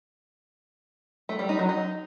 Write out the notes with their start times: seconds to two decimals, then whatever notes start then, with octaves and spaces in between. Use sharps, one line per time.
1.29 A3
1.39 G3
1.49 D#4
1.59 F#3
1.69 D#4